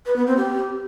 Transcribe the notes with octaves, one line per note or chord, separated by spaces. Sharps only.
B4
B3
C4
G4